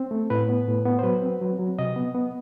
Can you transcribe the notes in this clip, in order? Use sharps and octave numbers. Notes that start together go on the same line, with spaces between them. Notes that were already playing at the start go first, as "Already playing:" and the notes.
Already playing: C4
A3
A2 B4
B3
A2
B3
C5
F#3 B4
C4
F#3
F#3
C3 D#5
B3
B3